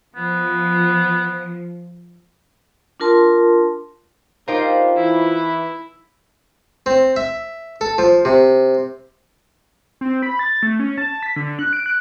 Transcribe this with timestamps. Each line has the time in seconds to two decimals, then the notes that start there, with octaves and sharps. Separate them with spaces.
0.16 F3 B3
3.00 D4 F4 A#4 A5 C6
4.48 D#3 G3 D4 D#4 F4 A#4 C5 G5
4.97 E3 E4
6.86 C4
7.16 E5
7.81 A4
7.98 F3
8.25 C3
10.01 C4
10.23 B5
10.39 A6
10.63 A3
10.79 C#4
10.98 A5
11.22 B6
11.36 D3
11.59 F#6
11.73 D7
11.86 F#6